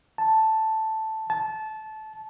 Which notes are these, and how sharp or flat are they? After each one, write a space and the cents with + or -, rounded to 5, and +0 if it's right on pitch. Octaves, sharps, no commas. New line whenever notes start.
A5 +0
A5 -20